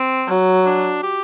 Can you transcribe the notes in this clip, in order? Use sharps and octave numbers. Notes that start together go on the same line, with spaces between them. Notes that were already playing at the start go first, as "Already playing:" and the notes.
Already playing: C4
F#3
D4
G4